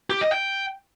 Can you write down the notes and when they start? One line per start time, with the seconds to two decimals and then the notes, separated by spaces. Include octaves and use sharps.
0.10 G4
0.21 D#5
0.32 G5